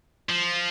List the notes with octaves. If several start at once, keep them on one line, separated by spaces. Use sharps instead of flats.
F3